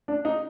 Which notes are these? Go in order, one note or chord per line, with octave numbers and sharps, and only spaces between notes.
D4
D#4